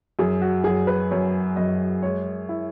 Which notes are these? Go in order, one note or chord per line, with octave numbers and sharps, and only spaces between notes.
F#2 G#4
F#4
F#2 G#4
B4
F#2 C#5
F#2 D#5
G#3 C#5
E4